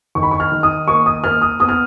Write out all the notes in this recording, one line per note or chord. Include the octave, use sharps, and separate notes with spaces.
D#3 C#6
B5
C#6
F6
D#3
D#6
A#3 C#6
D#6
A#3 F6
D#6
B3 D#6
F6